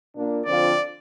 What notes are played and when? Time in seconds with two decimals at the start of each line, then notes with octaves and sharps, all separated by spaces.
0.15 A#2 A#3 D4
0.46 D3 F3 C4 F4 D5